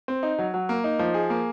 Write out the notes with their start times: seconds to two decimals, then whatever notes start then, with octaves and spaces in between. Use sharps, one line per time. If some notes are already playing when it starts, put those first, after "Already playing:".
0.08 C4
0.23 D#4
0.38 F#3
0.54 F#3
0.69 A#3
0.84 D#4
0.99 F3
1.14 G#4
1.30 A#3